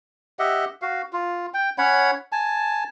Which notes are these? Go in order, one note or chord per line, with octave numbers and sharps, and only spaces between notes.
G4 D#5 E5 F#5
F#4 F5
F4
G5
C#4 C#5 F#5 B5
G#5 A5